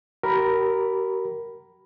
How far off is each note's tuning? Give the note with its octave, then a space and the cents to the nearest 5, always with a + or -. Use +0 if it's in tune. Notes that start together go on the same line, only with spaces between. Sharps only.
G4 -45 A#4 +0 B5 +0